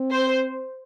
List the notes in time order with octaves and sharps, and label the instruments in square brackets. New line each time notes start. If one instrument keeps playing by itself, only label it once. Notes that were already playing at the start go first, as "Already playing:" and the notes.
Already playing: [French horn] C4
[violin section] C5